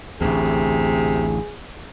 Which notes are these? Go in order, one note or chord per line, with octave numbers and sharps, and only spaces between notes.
A1 D2 C3 G#4